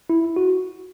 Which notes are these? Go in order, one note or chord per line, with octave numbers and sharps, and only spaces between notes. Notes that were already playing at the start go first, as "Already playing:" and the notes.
E4
F#4